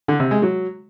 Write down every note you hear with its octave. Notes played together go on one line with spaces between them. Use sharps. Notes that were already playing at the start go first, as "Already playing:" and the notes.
D3
C3
G#3
F#3